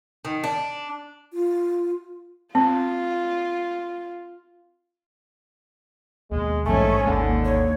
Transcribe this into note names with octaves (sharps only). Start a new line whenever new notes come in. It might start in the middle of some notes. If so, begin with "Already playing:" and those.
D#3
D4
F4
C4 F4
D#2 B2 G#3
A#1 G#2 D3 E3 G#3 A3 C#4 G#5
D#1 G#1 D#2 D3
C#5